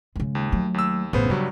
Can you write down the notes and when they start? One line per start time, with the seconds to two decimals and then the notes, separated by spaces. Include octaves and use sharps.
0.16 C#3 G#3
0.35 D#2
0.52 F#3 A3
0.74 D#2 E6
1.13 A1 C#3 B3 C5
1.30 G2 C#3 F#3 G3